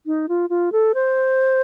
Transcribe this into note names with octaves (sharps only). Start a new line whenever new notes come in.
D#4
F4
F4
A4
C5